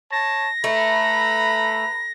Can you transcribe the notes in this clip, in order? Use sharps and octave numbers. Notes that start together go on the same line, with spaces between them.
C#5 A5 A#6
A3 B4 A#5 B5